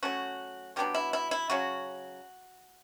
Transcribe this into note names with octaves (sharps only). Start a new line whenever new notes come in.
F#3 A3 C#4 F#4
B2 F#3 B3 D4 G4
E4
E4
E4
C#3 F#3 C#4 F#4